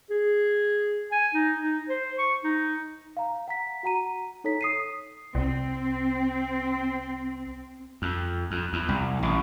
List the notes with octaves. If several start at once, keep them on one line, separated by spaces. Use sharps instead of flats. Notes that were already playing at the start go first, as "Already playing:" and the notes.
G#4
G#5
D#4
D#4
C5
C#6
D#4
F5 A#5
F#5 A#5 B6
F#4 F#5 A#5 D#7
D#4 A4 C#5 A#5 B6
D#6 C7 D#7
C2 C4
F2
F2
E2
C2
A1